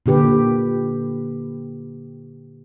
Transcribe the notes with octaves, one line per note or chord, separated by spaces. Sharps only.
A#2 D3 G4 B4